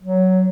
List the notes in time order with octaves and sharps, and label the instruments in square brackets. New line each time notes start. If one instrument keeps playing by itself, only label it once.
[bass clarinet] F#3